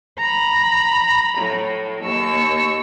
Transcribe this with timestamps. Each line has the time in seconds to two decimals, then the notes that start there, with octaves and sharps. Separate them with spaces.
0.18 A#5 B5
1.38 A2 F#3
2.03 D#2 A#3 C#6 E6